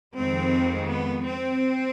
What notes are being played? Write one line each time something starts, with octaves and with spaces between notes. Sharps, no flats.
F2 D#3 G#3 C4
B3
C4